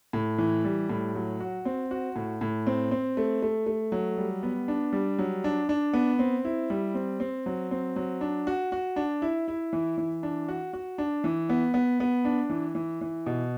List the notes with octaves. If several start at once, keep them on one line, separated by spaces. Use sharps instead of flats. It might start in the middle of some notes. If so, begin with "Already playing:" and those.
A2
E3
G3
A2
F#3
F#4
C4
F#4
A2
A2
C4
C4
A3
A3
A3
F#3
G3
B3
D4
G3
F#3
D4
D4
B3
C4
E4
G3
C4
C4
F#3
C4
F#3
D4
F#4
F#4
D4
E4
E4
E3
E3
D4
F#4
F#4
D4
E3
B3
B3
B3
D4
E3
E3
E3
B2